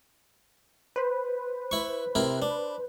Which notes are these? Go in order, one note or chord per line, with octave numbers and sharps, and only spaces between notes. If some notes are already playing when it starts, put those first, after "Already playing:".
B4 C5
E4 C#6
C3 E4 A#4
D4